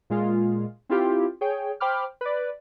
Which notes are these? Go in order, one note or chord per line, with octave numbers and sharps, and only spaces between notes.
A#2 G#3 F4
C4 E4 F4 G4
G#4 C#5 G5
C5 G5 B5 D6 F6
B4 D5